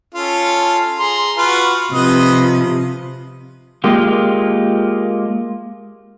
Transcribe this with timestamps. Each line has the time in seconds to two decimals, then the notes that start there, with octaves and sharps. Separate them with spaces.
0.15 C#4 F4 A4
0.99 G#4 A#5 C6
1.37 F4 F#4 B4
1.93 C3 F3 B4 D#5
3.84 G#3 A#3 F4 G4